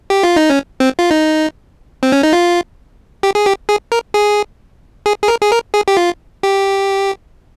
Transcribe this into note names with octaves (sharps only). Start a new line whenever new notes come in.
G4
F4
D#4
C#4
C4
F4
D#4
C4
C#4
D#4
F4
G4
G#4
G4
G#4
A#4
G#4
G#4
G#4
A#4
G#4
A#4
G#4
G4
F4
G4